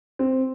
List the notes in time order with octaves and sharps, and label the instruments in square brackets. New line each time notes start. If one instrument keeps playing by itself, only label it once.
[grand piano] C4